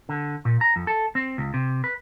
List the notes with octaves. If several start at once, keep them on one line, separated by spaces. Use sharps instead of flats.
D3
A#2
A#5
F2
A4
C4
C#2
C3
B4